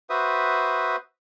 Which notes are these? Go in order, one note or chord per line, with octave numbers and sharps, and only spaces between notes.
F#4 B4 C5 E5 D#6